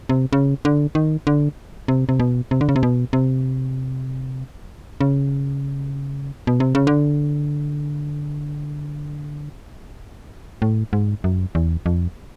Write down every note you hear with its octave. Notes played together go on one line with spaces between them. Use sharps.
C3
C#3
D3
D#3
D3
C3
C3
B2
C3
D3
C#3
C3
B2
C3
C#3
B2
C3
C#3
D3
A2
G#2
F#2
E2
F2